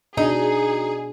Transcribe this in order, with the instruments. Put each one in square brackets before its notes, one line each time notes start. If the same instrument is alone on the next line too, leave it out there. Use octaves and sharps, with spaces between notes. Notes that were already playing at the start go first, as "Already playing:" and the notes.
[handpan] B2 D4 [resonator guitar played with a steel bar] D#4 [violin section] G#4